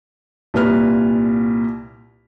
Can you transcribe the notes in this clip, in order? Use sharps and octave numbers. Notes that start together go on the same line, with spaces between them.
C2 A#2 B4 F6